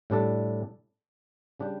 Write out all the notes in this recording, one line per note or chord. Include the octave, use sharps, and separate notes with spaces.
A2 G3 D4 A4
C#3 G3 D4 G4